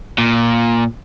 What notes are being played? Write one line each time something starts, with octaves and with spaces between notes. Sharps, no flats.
A#2